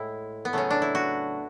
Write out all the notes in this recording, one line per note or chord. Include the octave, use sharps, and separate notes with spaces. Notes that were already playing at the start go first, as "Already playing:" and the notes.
Already playing: A2 G#3 E4
B3
C#3 F#3 A3 C#4
D4
E4
F#4